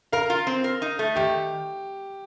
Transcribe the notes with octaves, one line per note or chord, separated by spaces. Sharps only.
A#4 F5
F4
C4
A#4
D#4
A3
D#3 G4